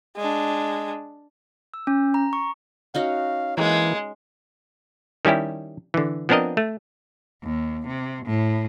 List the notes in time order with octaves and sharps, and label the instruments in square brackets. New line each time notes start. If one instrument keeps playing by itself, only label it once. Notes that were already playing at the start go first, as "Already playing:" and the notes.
[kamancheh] G#3 D4
[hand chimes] E6
C#4
A#5
C#6
[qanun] C#4 D#4 F#4 [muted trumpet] F5
[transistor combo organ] E3 [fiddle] G#3 [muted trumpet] A#3
[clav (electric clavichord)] D#3 G3 C#4 E4 G4
D3 E3
F3 B3 C4 D4 A#4 D#5
A3
[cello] D#2
C3
A2